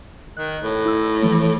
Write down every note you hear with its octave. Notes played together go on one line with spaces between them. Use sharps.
D#3 F#6
A2
E4 E6
E3 F3 A3